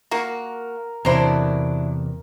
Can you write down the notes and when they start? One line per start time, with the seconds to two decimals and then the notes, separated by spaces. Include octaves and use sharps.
0.11 A#3 F#4 A#4
1.05 E2 C3 F#3 D4 E4 C5 A#5